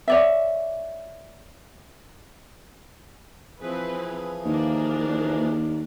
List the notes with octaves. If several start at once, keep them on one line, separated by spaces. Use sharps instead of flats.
C#5 D5 E5
E3 F3 C4 E4 G#4 B4
D#2 A#3 D4 A#4